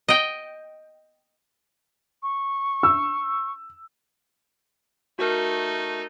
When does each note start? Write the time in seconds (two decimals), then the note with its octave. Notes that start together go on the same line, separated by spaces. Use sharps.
0.09 D#5 G5
2.23 C#6
2.83 E6
5.19 A3 D#4 F#4 A#4